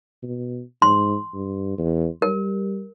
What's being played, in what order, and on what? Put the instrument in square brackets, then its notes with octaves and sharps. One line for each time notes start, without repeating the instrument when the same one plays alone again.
[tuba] B2
[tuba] G#2 [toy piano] C6
[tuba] G2
E2
[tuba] G3 [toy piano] A#4